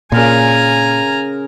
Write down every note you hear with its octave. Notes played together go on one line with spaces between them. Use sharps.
A#2 C#3 A#4 G#5 A#5 C6